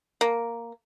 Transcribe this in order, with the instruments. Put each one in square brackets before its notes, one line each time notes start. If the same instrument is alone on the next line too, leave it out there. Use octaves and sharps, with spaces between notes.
[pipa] A#3